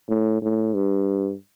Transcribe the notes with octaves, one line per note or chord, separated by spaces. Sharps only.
A2
A2
G2